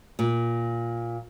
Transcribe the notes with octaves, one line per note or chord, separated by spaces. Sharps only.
A#2